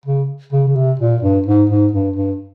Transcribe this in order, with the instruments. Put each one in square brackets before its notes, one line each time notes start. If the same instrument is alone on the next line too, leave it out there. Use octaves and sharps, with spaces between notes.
[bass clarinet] C#3
C#3
C#3
C3
A#2
G2
G#2
G#2
G2
G2